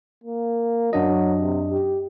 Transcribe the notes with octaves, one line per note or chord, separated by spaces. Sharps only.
A#3
F#2 F#3 D4 D#5
C3
G4